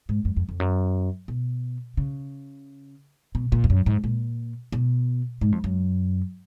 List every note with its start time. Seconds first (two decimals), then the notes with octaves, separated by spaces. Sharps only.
0.09 G#2
0.25 F#2
0.37 F2
0.49 F2
0.60 F#2
1.28 B2
1.97 C#3
3.35 B2
3.52 A#2
3.64 F2
3.70 F#2
3.86 G#2
4.04 A#2
4.72 B2
5.41 G#2
5.52 F2
5.64 F#2